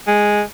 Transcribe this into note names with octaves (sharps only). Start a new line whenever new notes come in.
G#3